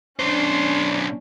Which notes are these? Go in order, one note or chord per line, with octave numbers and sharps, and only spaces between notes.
B1 C#4 D4 C5